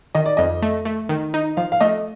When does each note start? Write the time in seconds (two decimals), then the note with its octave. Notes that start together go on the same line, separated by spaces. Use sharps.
0.15 D#3 D#5
0.26 D5
0.37 F2 D#5
0.62 A3
0.85 A3
1.09 D#3
1.34 D#4
1.57 F3 F5
1.72 F5
1.81 A3 D#5